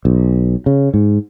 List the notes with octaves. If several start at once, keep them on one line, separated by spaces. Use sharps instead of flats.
B1
C#3
G#2